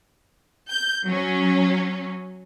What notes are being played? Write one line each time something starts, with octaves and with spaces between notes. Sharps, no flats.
G6
F#3 C#4